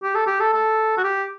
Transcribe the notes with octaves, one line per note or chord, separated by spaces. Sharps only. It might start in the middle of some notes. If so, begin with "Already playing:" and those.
G4
A4
G4
A4
A4
F#4
G4